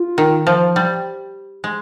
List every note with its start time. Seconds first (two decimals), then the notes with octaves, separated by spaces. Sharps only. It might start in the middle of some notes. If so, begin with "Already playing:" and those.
Already playing: F4
0.18 D#3
0.47 F3
0.76 G3
1.64 G#3